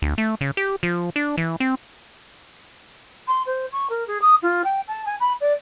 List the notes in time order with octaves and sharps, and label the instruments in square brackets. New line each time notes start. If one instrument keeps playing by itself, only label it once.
[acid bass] D2
A3
C#3
G4
F3
D4
E3
C4
[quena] C6
C5
C#6
A#4
G#4
D#6
F4
G5
A5
G#5
B5
D5